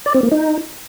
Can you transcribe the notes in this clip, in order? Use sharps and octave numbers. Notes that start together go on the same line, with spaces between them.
D5
C4
A#3
D#4